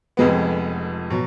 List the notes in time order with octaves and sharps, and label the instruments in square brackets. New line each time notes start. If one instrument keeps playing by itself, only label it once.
[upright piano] F1 F2 F3 G#3 B3
B2 F#3